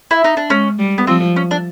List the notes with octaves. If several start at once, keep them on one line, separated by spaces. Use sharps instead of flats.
E4
D#4
D4
G#3 C#4
G3
B3
F3 C4
C#4
D4